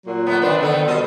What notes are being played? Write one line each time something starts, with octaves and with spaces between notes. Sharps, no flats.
A#2 F#3
A3 B3
D#3 D4 B4 C5
D3 D#3 B3 A4
B2 G3 A#4 C5 D#5